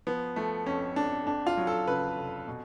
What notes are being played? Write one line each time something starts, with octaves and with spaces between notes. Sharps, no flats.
F3 B3
F3 A3
F2 C#4
F2 D4
F2 D4
F4
F#3
A4
C#3 B4
F1
B2